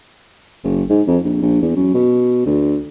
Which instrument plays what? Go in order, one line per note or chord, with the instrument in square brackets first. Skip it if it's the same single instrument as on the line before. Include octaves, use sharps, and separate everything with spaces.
[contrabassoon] F#1
G#2
F2
A#1
A#1
E2
F#2
B2
D2